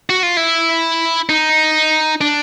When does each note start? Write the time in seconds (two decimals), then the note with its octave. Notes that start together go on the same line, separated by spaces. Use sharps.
0.10 F#4
0.23 F4
0.37 E4
1.29 D#4
2.21 D4